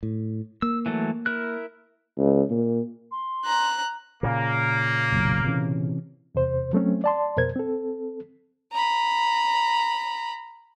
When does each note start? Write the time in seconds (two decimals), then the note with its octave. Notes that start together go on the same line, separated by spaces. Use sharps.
0.03 A2
0.62 A#3 E6
0.86 E3 F#3 A3
1.26 E4 A#4 F#6
2.18 C#2
2.50 A#2
3.12 C6
3.45 A#5 F#6
4.23 A#2 C#3 A#3
5.12 F#1 B1
5.45 C3 E3 C#4
6.35 E2 C3 C5
6.73 F#3 A3 C4 C#4
7.04 D5 A5 C6
7.37 F2 B2 A#4 C5 G#6
7.56 C4 A4
8.72 A#5 B5